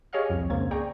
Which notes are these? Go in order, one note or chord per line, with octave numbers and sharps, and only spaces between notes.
G4 G#4 C#5 D#5 F5 F6
C2 F2
G#1 C#2 C#3 A#3 C4 G#6
G#4 D5 G5 A#5 C#6